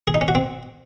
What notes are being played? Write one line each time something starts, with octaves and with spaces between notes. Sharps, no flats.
G#4
D#4
C#4
F#4
C4